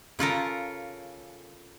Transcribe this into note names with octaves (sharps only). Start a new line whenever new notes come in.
C#3 F4 A4 A#4